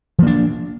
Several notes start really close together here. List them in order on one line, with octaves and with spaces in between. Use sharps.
F3 A#3 D4